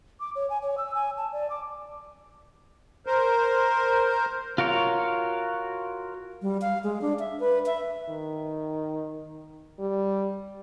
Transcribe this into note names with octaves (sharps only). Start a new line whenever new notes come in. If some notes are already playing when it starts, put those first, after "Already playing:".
D6
C#5
G#5
C#5
E6
G#5
A5
D5
D6
A#4 C5
F4 F#4 A#4 C#5 F5
G3
F5
G#3
D4
E5
B4
E5
D#3
G3